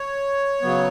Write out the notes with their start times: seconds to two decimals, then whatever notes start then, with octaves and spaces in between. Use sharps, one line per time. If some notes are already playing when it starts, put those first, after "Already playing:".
Already playing: C#5
0.62 C#3 F#3 B3